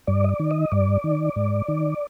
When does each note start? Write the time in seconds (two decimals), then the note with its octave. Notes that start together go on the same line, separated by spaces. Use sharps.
0.07 G2 D5
0.24 D#5
0.29 D5
0.39 D#3
0.51 D#5
0.72 G2 D5
1.04 D#3
1.36 G#2
1.68 D#3